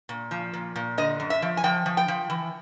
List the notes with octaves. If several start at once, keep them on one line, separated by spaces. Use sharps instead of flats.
A#2
F3
A#2
A#2
D3 D#5
F#2
E5
F3
G#5
F3 G5
F3
G5
F3
E3